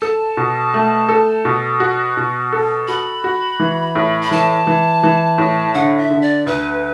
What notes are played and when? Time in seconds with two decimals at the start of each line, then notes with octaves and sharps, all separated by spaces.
0.01 A4 A5
0.37 B2
0.74 A3
1.09 A4
1.45 B2
1.80 F#4
2.17 B2
2.53 A4
2.88 F#4 B5
3.24 F#4
3.60 E3
3.95 A2
4.22 B5
4.31 E3 A5
4.67 E3
5.03 E3
5.38 A2
5.74 D3 F#5
5.98 E5
6.10 D3
6.22 D5
6.47 D2 B4